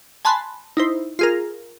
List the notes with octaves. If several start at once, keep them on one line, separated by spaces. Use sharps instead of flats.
G#5 A5 B5 C6 F#6
D#4 E4 C5
F4 G#4 A#4